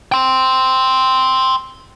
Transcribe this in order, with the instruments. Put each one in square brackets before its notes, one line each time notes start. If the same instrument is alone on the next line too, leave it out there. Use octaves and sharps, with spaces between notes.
[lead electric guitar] G5 C6